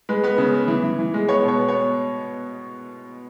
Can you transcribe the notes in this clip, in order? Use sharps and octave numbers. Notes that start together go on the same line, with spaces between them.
G#3 B4
B3 B4
C#3
B3
E3
E3
E3
G#3
B3 C#5
B2 C#5
B3
C#5